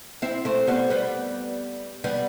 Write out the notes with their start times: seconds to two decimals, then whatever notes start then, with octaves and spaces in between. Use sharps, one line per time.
0.22 C4 E4
0.45 A3 C4
0.67 G3 B3
0.90 G3 B3
2.04 G3 B3